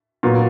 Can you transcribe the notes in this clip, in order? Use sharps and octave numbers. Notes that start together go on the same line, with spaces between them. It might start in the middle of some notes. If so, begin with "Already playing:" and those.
A#2 F#3 B3